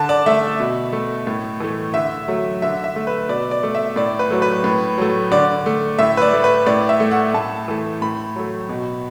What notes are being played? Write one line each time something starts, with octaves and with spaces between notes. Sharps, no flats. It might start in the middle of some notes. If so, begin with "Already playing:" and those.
Already playing: D3 A5
D5
A3 E5
B2
A3
A2
E3 A3
D3 E5
F#3 A3
D3 E5
E5
A3
B4
B2 D5
D5
A3
E5
A2 D5
B4
F#3 A3
B4
A2
F#3 A3
D3 D5
A3
A2 E5
B4
D5
A3
B4
A2 D5
E5
A3
F#5
A2 A5
E3 A3
A2 B5
F#3 A3
B2